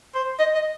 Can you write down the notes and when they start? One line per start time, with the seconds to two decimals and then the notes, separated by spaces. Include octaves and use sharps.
0.15 C5
0.39 D#5
0.55 D#5